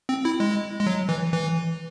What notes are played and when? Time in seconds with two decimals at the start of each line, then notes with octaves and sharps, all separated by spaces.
0.09 C4
0.25 E4
0.40 G#3
0.80 G#3
0.87 F#3
1.09 E3
1.33 E3